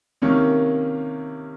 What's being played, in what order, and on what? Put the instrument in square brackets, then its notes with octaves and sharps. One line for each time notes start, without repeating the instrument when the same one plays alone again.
[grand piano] C3 D#3 A#3 C#4